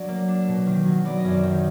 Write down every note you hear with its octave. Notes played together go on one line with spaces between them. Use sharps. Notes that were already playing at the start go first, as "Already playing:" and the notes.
Already playing: F#3 D4 D5
A#3
D4
B2
D#3
F#3
B3 D5
D#5
F#2 D5
D#3